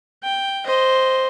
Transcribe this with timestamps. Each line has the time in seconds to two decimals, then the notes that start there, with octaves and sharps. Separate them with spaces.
0.23 G5
0.65 C5 D#5